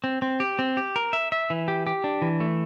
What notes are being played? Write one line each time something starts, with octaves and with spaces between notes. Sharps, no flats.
C4
C4
G4
C4
G4
A#4
E5
E5
E3
G4
G4
D4
E3
A3